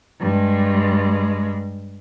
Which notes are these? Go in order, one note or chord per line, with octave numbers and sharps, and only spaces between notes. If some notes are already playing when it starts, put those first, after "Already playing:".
G2 G#3